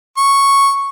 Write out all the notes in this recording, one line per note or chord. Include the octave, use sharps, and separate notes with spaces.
C#6